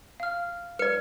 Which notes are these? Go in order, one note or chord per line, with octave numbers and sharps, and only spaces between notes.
F5 F6
B4 D5 F6 C#7